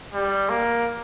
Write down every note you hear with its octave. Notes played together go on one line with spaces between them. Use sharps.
G3
A#3